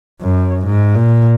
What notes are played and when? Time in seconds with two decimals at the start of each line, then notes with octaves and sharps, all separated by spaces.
0.22 F#2
0.66 G#2
0.95 A#2